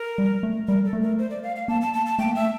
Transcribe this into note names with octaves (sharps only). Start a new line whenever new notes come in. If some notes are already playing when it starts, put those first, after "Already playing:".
Already playing: A#4
G3
A3
G3 A#4
A4
A3
A#4
C5
D5
F5
F5
A#3 A5
A5
A5
A5
A3 G5
A#3
A3 E5